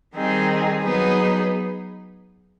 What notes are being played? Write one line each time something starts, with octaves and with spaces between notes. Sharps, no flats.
D#3 G3 C4 D#4 G#4
F#3 B3 D#4 G#4 B4